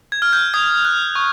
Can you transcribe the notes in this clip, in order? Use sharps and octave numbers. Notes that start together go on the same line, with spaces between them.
G#6
F6
G6
D#6 G#6
F#6
C#6